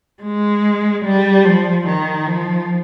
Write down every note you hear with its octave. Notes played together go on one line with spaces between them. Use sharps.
G#3
G3
F3
D#3
F3